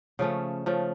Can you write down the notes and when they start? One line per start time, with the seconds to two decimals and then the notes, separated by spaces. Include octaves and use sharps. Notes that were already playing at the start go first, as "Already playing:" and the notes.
0.19 C#3 F3 A3 C#4
0.66 C#3 F3 A3